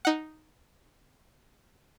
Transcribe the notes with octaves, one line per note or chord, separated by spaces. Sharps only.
D#4 F#5